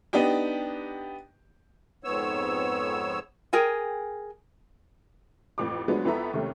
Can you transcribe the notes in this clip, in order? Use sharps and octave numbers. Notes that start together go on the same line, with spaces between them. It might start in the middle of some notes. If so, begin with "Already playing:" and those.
B3 D4 D#4 G4 G5
F2 G#2 B3 C#5 E6
G#4 A#4 G5 G#5
A1 F2 D6
F3 F#3 G#3 A3 B3 D4
F2 B3 E4 A4 E5 A#5
D#2 C3 A3 C#4